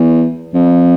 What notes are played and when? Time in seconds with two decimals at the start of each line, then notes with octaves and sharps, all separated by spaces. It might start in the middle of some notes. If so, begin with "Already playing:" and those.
Already playing: E2
0.54 F2